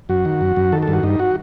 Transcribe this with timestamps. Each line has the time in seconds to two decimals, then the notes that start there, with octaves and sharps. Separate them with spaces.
0.09 F#2 F#4
0.25 D#3
0.41 F#2
0.57 F#2
0.72 D#3 A4
0.82 A4
0.88 G2
0.93 F#4
1.03 G2 D#4
1.19 F#4